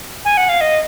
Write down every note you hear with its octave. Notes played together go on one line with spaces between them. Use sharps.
G#5
F#5
F5
D#5